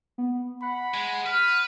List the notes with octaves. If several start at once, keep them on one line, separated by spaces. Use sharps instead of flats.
B3
F#5 B5
G#3
B4 F6